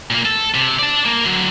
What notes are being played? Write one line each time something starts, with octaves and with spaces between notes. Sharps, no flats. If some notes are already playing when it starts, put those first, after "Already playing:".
A#2 A#3
A4
C3
D5 A5
A#3
D3 F#3